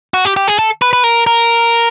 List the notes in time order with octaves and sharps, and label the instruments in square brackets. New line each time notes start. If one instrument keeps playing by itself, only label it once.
[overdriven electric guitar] F#4
G4
G4
G#4
A4
B4
B4
A#4
A#4